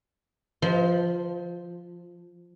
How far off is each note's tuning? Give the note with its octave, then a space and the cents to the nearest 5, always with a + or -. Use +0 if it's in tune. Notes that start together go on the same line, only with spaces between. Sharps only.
F3 +0 B4 +35 D#5 +35